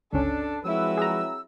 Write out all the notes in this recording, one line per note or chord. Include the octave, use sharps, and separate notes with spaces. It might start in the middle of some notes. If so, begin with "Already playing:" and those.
G1 C#2 C#4 D4 A4
F3 F#3 G#3 C4 E4 F#4 B4 E6
G#4 A#5